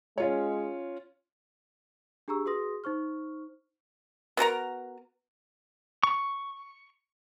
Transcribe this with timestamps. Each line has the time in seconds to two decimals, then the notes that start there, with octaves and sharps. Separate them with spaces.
0.18 G#3 C#4 F4 C#5
2.28 D4 G4 G#4 A#5 C#6 E6
2.46 F#4 G#4 B4 C6 D#6 A#6
2.84 D#4 C5 C#6 F6
4.37 B3 F#4 A#4 A#5
6.03 C#6